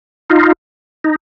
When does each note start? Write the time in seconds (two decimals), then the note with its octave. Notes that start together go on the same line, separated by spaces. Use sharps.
0.30 D#4 F4
1.04 D#4